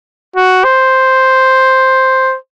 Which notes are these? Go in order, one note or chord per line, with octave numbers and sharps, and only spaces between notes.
F#4
C5